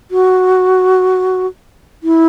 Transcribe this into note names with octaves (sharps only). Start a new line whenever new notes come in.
F#4
E4